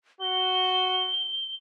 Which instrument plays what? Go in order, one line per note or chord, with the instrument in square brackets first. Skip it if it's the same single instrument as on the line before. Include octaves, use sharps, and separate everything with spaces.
[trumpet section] F#4 [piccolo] G7